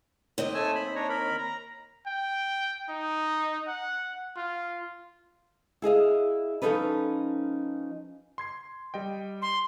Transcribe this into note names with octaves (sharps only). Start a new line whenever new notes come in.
D#2 C4 D#5
A3 G#5 E6
B5
D4 C#5 A#5
A#4 B5
A#5
G5
D#4
F#5
F4
E4 G#4 D#5 F5
F3 A#3 C#4 D#4 A4 B4
C6 G#6 C7
G3 D#5 G5
C6